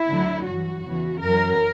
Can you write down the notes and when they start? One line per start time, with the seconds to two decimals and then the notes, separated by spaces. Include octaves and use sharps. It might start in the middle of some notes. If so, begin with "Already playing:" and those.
Already playing: E4
0.09 D2 D3 F#3
0.46 G2 E3 F#4
0.84 E2 C#3 E3
1.21 F#2 E3 A#4